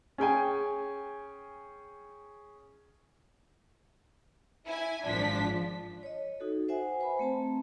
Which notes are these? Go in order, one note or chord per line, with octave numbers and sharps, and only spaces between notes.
C#4 G#4 G5 G#5
E4 G#5
G#1 F3 D4 B6
C#5 D#5
D#4 F#4 A4
C5 E5 F#5 G#5
B4 C5 G#5 B5
A3 C4 A5 A#5